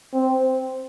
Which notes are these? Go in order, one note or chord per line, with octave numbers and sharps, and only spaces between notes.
C4